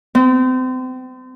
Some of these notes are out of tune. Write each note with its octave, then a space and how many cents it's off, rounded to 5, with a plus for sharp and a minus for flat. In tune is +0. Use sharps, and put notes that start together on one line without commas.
C4 -35